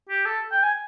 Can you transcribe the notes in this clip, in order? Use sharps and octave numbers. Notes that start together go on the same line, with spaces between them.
G4
A4
G5
G#5